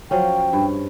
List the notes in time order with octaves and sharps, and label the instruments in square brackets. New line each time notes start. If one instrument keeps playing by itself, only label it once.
[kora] F3 F#3 C#4 [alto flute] G5
[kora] G2